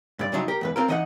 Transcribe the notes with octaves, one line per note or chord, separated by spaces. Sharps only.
G2 D5
C2 F2 F#3 D4 D#4 E5
G4 A#4
E2 G#2 B4
C4 F4 A#4
E3 D#4 D#5 E5 F#5